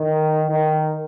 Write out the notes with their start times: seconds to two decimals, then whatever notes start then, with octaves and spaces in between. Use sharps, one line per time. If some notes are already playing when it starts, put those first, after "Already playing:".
Already playing: D#3
0.50 D#3